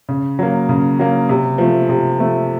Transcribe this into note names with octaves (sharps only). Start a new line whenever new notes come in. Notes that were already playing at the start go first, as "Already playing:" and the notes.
C#3
F#3 A#3
C#3
F#3 A#3
C3
F3 A3
C3
F3 A3